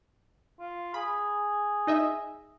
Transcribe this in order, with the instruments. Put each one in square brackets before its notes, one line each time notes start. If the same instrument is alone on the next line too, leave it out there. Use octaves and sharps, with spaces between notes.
[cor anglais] F4
[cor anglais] G#4 [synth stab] B5
[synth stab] D#4 D#5 E5